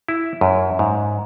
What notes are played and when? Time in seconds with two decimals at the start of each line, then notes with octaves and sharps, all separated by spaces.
0.08 E4
0.41 F#2
0.79 G#2